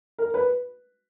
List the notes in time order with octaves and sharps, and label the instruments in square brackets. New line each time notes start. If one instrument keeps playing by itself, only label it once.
[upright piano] A#4
B4